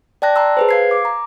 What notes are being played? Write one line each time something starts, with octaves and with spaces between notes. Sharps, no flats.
D5 G5 A5 F#6 A#6
A5 A#5 C6 E6
G#4 B4 C5
F5 G#6 C7
D6
A#5